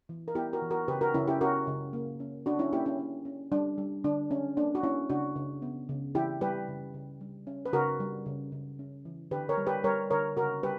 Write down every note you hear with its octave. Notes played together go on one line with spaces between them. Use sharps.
E3
A#4
B3 E4 G4
F#4 A#4
E3
F#4 A#4
C#3 G4 B4
F#4 A#4
C#3 C#4 E4
E4 G4
C#4 F#4 A#4
C#3
A#3
C#4
C#4 D4 F#4
C#4 E4
A#3 E4 G4
C#4 E4
C#4
C#4
G3 D4
G3
D3 D4
C#4
A#3 D4
F#4
A#3 C#4 E4
C#3 D4 F#4
C#3
B3
C#3
E3 E4 G4
G3 G4 B4
C#3
C#3
G3
C#4
B4
C#3 F#4 A#4
G3
C#3
C#3
C#4
E3
D3 G4 B4
A#4 C#5
G3
G4 B4
G3 A#4 C#5
D3 A#4 C#5
C#3 F#4 A#4
G3 G4 B4